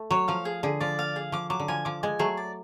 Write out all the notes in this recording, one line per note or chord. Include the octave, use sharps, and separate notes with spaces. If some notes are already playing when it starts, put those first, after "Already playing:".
Already playing: A3
F#3 C#5
F3 F5
G#4
D3 G#4
F3 D5
F5
G#4
F3 D6
F#3 D6
D3
F3 G#5
F3 D6
G#3 G#5
F#3 A3 G#4
D5